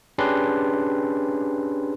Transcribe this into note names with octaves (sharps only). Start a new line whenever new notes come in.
C#4 D4 G4 G#4 B4 C6